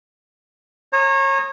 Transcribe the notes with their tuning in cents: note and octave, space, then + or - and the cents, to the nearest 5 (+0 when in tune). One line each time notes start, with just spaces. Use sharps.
C#5 -30 A#5 -20 D#6 +0